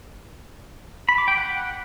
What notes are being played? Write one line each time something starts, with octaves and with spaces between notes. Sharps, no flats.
B5
D6
G5
F#5